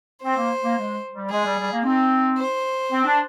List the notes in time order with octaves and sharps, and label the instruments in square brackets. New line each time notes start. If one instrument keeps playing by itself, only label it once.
[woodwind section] C4 [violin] C5
[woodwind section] A#3
A#3
G#3
G3
[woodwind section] G#3 [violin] G#4
[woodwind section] G3
G3
A#3
[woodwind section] C4 [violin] D#4
[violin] C5
[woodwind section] C4
D4